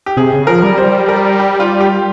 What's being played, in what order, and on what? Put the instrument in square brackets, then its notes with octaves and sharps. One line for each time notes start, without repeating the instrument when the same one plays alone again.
[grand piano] G4
[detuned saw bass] C3 [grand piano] G#4
[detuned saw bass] C#3
[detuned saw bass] F3 [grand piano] A#4
[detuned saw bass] G3
[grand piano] C5
A#4
G4
F4
G4